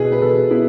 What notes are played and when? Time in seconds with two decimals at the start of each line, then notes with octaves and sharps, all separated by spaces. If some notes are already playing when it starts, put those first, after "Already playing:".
Already playing: B2 E4 G#4 B4
0.12 B4
0.22 B2 A4
0.51 B3 E4